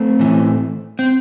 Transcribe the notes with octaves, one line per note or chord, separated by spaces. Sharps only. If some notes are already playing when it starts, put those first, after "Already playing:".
Already playing: A3 C4
A2 E3
C4